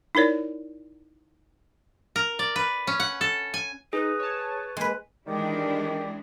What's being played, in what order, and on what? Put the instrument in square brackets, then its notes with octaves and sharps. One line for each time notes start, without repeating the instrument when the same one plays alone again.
[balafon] D#4 E4 A#4 C#5 D5
[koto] A#4
D5
B4
C#4
F#5
A4
G#5
[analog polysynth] D#4 [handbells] G#4 [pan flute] B4
[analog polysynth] C#5 A5
[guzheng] G#3 B4 [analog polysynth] A#3
[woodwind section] D#3 [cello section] E3 G#3 D4 [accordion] G4 D5